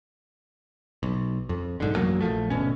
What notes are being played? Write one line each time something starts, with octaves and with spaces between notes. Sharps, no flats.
B1
F2
B1 G#2 D3
A1 F#2 F#3 A#3
A#1 F#2 F3 A3
G#1 D2 B2 C#4